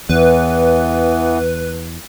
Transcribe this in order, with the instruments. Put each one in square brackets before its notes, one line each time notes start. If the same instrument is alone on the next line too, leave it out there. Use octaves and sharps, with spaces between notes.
[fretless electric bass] E2 [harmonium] E3 B3 [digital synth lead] B4